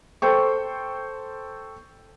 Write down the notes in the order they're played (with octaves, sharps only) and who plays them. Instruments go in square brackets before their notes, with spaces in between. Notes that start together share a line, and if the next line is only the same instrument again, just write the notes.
[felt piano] A4 C5 G5 C#6